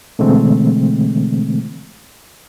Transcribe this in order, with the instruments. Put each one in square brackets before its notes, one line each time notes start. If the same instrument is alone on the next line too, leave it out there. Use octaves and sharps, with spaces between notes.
[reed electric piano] B2 D3 E3 G#3 A3 C4